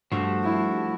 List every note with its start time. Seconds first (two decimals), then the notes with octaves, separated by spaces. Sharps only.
0.12 G2 F3 A3 F#4
0.43 E4